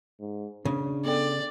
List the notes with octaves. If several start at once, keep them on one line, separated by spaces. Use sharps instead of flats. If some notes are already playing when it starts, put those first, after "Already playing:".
G#2
C#3 D4
B3 A4 D5 G5